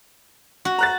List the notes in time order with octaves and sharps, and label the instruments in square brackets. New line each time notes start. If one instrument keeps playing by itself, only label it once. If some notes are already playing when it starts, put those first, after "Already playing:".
[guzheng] F#4
[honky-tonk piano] A#5 F#6 A6